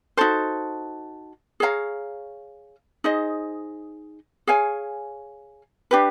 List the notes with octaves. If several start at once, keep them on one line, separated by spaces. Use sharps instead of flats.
D#4 F#4 A4 C5
G#4 C#5 F5 A#5
D#4 G#4 C5 D#5
G#4 C#5 F5 G#5
D4 G4 B4